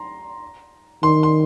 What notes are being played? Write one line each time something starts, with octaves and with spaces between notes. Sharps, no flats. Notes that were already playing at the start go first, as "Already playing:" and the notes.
Already playing: A#5 C6
D#3 C6
C6